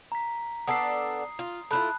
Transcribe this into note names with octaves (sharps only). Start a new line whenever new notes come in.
A#5 B6
B3 D4 A4 D#6 C7
F4
A3 E4 F4 A5 B5 F#6